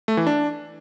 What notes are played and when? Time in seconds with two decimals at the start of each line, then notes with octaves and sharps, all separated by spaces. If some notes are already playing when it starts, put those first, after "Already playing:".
0.08 A3
0.17 E3
0.27 D4